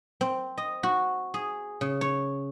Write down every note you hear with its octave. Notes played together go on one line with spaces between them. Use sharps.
C4
D#5
F#4
G#4
C#3
C#5